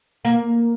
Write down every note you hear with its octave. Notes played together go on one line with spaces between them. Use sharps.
A#3